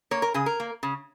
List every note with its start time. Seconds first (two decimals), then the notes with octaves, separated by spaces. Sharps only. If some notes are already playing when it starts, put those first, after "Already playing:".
0.11 A#3 C#5
0.22 A#4
0.34 C#3 G#4
0.46 A#4
0.60 A#3
0.83 C#3